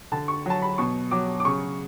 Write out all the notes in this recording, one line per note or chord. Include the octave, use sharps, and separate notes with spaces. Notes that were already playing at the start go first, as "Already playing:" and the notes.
D3 A5
C#6
F#3 A5
B5
B2 C#6
F#3 D6
D6
C#3 C#6